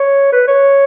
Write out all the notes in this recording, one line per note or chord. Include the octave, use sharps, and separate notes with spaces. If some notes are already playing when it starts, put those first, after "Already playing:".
Already playing: C#5
B4
C#5